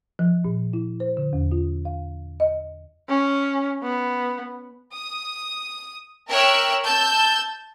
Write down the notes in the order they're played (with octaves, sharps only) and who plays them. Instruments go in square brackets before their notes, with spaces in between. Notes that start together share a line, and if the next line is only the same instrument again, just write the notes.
[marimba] F3
A#2
E4
C5
D3
E2
F4
F5
D#5
[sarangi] C#4
B3
[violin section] D#6
A#4 C#5 E5 G5 E6 F#6
A5 E6 G6